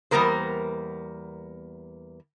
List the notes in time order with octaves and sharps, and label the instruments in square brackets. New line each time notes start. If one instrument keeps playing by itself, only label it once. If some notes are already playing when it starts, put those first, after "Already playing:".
[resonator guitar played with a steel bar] E2 G3 A#3 B3 A#4 C5